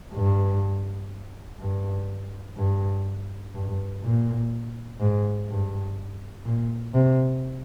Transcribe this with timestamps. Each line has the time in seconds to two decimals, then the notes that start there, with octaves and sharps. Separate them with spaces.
0.14 G2
1.60 G2
2.57 G2
3.55 G2
4.03 A#2
5.00 G#2
5.49 G2
6.46 A#2
6.94 C3